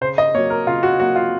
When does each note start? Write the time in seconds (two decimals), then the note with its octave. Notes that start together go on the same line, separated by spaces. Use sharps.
0.01 C#3 C5
0.18 D#5
0.34 A#3 C#5
0.38 F#3
0.50 A#4
0.67 C#3 F4
0.83 F#4
1.00 F#3 A#3 F#4
1.16 F4